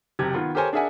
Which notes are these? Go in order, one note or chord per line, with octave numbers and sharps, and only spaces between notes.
F#1 C3 G4 G#6
D#3 B3 F4
G4 A4 A#4 C5 C#5 G#5
D4 G#4 A#4 E5 F#5 G#5